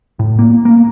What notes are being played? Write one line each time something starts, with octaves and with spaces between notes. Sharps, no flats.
A2
A#3
A#3